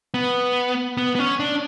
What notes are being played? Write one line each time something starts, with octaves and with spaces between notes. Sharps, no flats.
B3
B3
B3
C#4
D4